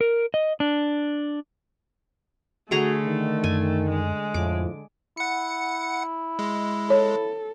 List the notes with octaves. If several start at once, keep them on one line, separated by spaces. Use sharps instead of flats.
A#4
D#5
D4
D3 A3 F#4 G#4 A#5
D#3
F#2 G#5
G#3
F2 A2 F3 D6
E4 F#5 C#7
G#3
A4 C#5